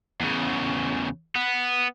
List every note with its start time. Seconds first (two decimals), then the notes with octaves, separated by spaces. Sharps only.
0.20 E2 C#3
1.36 B3